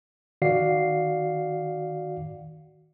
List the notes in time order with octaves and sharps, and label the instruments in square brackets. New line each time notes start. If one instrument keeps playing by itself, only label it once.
[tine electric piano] D#3 F#4 D5 F5 F#5 C7